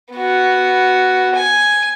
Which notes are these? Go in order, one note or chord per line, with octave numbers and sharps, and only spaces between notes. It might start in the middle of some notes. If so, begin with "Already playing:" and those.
B3 F#4
G#5